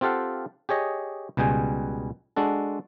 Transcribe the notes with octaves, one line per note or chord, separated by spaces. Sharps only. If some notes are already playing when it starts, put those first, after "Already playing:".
C4 F4 G4 A4 F5 F#5
G4 G#4 C#5 D#5
C#2 B2 G3 G#4 G5 G#5
G#3 D4 F#4 A4